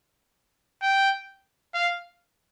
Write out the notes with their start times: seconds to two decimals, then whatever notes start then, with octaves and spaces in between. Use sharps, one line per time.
0.82 G5
1.74 F5